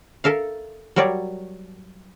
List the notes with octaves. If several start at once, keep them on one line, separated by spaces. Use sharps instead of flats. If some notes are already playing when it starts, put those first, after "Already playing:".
A4 A#4 E5 F5
F#3 G3 A#4 C#5 D5